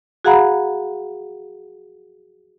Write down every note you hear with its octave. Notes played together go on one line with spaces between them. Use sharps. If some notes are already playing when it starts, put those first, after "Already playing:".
F#4 G#4 F5 F#5 A#5 B5